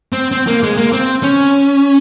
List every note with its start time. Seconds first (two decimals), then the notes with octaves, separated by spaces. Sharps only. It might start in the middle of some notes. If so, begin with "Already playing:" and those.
0.12 C4
0.31 C4
0.47 A#3
0.63 G#3
0.78 A#3
0.93 C4
1.23 C#4